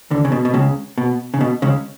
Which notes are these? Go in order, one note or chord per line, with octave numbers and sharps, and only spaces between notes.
D2 D3
C#3
B2
B2
C#2 C#3
B2
C#3
B2
C#2 C#3